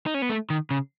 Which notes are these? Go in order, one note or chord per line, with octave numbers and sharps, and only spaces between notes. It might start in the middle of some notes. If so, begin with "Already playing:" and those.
D#4
C#4
B3
A3
D#3
C#3